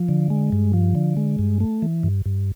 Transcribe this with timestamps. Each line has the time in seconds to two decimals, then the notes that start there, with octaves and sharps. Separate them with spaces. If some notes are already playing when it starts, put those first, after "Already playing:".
Already playing: F3
0.09 D3
0.30 G#3
0.52 G2
0.73 F3
0.95 D3
1.17 G#3
1.39 G2
1.60 A3
1.82 E3
2.03 G2
2.26 G2